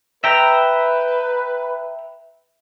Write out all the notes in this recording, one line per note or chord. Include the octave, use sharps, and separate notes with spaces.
B4 E5 G5 A#5